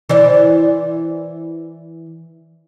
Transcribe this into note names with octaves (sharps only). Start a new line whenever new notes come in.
E3 C5 D5